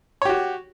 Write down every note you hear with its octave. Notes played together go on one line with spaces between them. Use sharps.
F#4 G4 C#5